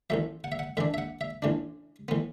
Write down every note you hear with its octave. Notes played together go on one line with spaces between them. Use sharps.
A1 A2 F#3 E5
F#5
E5
F#5
A2 E3 D4 E5
E5
F#5
E5
A1 A2 E3 D4
A2 E3 B3